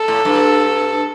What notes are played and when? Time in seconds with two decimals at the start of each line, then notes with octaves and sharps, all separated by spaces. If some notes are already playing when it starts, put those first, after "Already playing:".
Already playing: A4
0.08 A2
0.25 G2